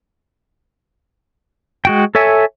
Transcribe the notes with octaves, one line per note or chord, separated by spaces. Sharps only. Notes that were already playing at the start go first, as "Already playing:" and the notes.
G#3 F#4 G5
A4 C#5 E5 G#5